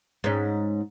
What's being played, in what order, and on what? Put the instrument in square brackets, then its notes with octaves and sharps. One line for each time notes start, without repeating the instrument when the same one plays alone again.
[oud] G#2 C#4